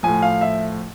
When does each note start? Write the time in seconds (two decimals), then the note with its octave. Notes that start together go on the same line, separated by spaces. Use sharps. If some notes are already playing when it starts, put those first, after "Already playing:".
0.03 A2 F3 G#5
0.22 F5
0.41 E5